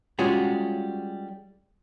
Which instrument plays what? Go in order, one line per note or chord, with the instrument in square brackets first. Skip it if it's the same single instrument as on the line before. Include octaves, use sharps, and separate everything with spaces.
[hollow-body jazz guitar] G3 G#3 C#4 F4 F#4 G#4